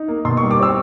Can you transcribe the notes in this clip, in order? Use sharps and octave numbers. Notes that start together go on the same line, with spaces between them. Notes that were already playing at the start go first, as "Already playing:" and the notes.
Already playing: D#4
A#3
B2 C6
G3 C#6
D6
C4 E6